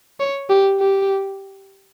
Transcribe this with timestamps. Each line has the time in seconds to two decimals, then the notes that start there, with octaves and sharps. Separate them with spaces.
0.20 C#5
0.50 G4
0.80 G4